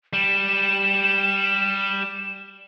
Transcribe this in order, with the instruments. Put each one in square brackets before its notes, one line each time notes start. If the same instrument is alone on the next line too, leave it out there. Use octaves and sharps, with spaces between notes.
[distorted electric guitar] G3 [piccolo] E7